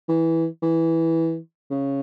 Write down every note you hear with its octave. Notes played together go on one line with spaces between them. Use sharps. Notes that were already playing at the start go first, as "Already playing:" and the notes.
E3
E3
C#3